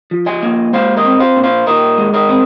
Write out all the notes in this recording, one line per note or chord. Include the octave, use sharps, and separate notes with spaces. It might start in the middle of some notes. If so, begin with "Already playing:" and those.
F3
D#5 G#5
A#3
G#3 C5 F5
A#4 D#5
C4
C5 F5
A#2
C5 F5
A#2 A#4 D#5
G#3
A#4 D#5
C4